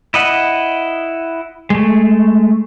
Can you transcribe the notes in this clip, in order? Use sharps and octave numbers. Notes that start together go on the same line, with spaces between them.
E4 D#5 F#5
G#3 A3